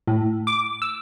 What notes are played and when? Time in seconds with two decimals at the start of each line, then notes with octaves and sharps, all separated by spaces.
0.07 A2
0.47 D6
0.82 E6